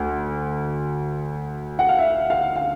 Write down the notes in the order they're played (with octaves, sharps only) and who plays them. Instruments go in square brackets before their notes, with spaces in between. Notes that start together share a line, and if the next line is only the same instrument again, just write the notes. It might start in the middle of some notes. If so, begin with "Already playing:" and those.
Already playing: [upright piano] D2
F#5
F5
E5
F5
F5